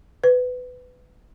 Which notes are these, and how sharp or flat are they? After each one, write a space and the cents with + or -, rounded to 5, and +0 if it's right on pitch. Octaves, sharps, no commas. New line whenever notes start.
B4 +20